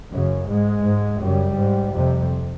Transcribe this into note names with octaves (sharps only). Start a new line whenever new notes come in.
F#2 C#3
G#2 G#3
G#2
F#2 C#3 G3
G#2
F2 C3